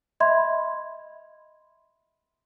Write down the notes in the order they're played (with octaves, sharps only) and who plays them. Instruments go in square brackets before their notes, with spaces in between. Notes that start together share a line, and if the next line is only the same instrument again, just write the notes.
[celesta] D#5 E5 B5 C6 G#6